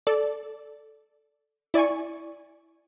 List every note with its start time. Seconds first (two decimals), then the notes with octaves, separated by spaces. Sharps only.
0.07 A4 D5
1.74 E4 D5 G#5 C#6